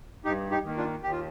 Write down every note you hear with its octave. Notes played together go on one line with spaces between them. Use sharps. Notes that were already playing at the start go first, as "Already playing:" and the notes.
G2 D#4 G4
D#4 G4
D#3 A#3
D4 F4
D#2 G4
F4